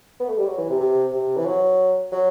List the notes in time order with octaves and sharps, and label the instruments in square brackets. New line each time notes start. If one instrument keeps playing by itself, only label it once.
[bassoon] B3
A3
G3
F#3
E3
C3
C3
C3
E3
F#3
F#3